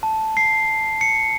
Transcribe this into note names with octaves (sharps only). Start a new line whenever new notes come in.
A5
C7
C#7